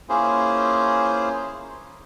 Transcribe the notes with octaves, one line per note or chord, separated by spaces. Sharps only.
A#3 C#4 E4 F4 G#4 C5